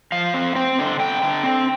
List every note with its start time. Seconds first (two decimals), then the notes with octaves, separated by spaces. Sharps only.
0.12 F3 F5
0.34 C4
0.56 C4 G5
0.78 D3
1.00 D3 G5
1.22 D3
1.43 C4